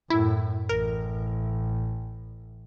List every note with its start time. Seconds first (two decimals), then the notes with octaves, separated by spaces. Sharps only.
0.10 F#2 A2 E4
0.69 A1 A#4